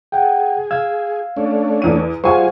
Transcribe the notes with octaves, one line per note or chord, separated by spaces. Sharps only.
G#4 F#5 G5
F5 E6 G#6
A3 C#4 D4
E2 D#7
G3 F4 G#4 C5 F5 F#5 G#5 C#6